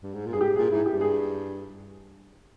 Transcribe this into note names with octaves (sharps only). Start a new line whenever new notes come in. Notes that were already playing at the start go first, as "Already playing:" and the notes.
G2
G#2
A#2
G2 G#4
G#2 G4
A#2 G#4
G#2 E4
G2 G4
G#4